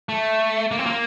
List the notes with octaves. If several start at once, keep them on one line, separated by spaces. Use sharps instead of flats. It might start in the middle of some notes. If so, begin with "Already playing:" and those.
A3
A#3
C4
A#3